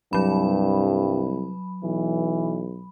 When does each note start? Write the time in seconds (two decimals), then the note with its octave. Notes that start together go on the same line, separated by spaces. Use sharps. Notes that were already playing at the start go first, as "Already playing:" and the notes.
0.13 C2 G2 F#3 B5
1.83 B1 E3